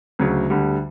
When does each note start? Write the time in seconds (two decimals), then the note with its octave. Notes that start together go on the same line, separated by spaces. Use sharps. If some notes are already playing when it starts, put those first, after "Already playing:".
0.19 D2 C#3 F#3
0.50 D2 D3 G3